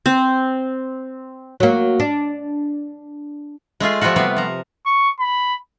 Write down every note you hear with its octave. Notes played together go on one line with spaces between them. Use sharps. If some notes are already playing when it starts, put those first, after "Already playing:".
C4
F#3 A#3
D4
G#3 A3 F4 G#4
F3 G3 A3 F4 F#4
C3 G3 B3
F3 A#5
C#6
B5